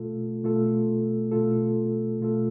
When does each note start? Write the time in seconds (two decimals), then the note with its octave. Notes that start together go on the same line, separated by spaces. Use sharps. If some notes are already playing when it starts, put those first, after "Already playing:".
Already playing: B2 A3 F4 A4
0.44 B2 A3 F4 A4
1.31 B2 A3 F4 A4
2.20 B2 A3 F4 A4